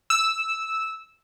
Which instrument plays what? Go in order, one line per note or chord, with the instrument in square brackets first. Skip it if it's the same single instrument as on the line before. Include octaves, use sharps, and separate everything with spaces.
[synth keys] E6